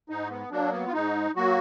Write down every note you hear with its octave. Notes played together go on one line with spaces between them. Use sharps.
G#2 D#4
B3
F#3 A#3 D4
B3
F4
G#2 D#4
F#3 A#3 F#4